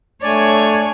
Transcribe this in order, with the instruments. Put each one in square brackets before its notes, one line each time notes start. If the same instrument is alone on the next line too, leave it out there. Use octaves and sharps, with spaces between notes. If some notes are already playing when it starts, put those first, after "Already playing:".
[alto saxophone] A3 [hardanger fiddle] D4 G#5 [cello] C#5 [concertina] D5